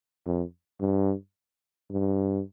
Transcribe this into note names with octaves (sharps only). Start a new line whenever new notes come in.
F2
G2
G2